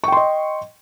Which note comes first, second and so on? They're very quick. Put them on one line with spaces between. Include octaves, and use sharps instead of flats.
C#6 G5 C6 D#5